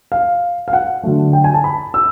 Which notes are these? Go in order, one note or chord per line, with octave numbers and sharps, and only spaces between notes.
F5
F5
F#5
D3 F#3 A3
G5
G#5
A5
B5
E6